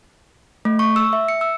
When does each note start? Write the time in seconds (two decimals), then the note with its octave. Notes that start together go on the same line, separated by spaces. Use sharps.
0.65 A3
0.79 C#6
0.96 E6
1.13 E5
1.28 C#7
1.41 E6